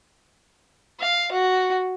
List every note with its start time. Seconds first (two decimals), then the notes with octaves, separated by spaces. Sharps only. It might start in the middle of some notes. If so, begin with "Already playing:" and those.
1.00 F5
1.31 F#4